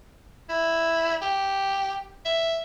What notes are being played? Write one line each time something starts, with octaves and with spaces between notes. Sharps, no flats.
E4
G4
E5